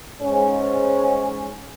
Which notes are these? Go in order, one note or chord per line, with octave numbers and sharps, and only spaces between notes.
G#2 C#4